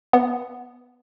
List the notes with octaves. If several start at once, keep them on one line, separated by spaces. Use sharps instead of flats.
B3